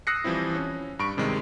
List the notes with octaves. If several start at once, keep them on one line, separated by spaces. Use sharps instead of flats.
D#6 E6 F#6 A#6 C7 C#7
E3 F3 G3 C4 E4
C#4
G2 B5 C#6 D7
G2 C3 D#3 G#3